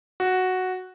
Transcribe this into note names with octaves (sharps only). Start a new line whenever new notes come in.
F#4